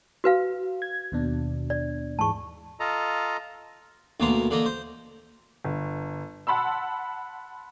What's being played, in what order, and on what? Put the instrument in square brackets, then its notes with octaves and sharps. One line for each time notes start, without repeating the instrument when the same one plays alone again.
[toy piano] F#4 B4 F5
[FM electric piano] G#6
D#2 B2 D4
[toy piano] D5
[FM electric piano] G#2 E3 G#3 [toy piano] A5 C#6
[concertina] F4 A4 D#5 A#5
[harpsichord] D2 B2 A#3 A#5 C6
D3 A#3 D#5 A#5
C5
[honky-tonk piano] G1
F#5 A5 B5 C6 E6